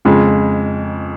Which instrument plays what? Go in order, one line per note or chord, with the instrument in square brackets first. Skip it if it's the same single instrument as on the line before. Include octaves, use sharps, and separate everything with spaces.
[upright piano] F2 C#3 G#3